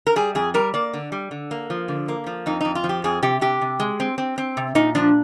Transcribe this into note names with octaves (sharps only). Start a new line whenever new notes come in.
A#4
G3 G#4
F2 G#4
G3 A#4
A#3 D5
D3
G3
D3
A#3
F3
D3
A#3
F3
F2 D#4
F2 D#4
F4
F3
G4
F2 G#4
C3 G4
C3 G4
C3
G#3
C4
C4
C4
C3
A#2 D#4
F3 D4